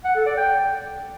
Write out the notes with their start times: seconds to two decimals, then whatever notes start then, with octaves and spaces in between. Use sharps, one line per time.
0.04 F#5
0.15 A4
0.26 D5
0.37 G5